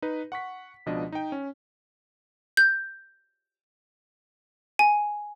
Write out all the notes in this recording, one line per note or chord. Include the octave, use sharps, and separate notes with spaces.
D#4 B4
F#5 C#6 B6
C#2 B2 F3 D4 D#5
D#4 G5
C#4
G6
G#5